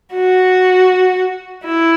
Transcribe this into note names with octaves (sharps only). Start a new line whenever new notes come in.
F#4
E4